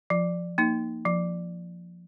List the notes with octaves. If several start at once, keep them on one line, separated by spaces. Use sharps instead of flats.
F3
A#3 D#4
F3